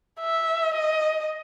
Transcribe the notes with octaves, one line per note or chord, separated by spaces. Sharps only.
E5
D#5